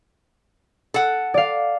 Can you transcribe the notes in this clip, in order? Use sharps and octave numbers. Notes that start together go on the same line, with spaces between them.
A4 F#5
D5 F5